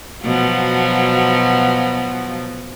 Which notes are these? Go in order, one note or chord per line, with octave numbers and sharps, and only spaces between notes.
B2 F3 F#3